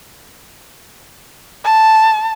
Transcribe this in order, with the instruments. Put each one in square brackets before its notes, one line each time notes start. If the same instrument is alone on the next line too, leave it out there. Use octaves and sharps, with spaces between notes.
[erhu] A5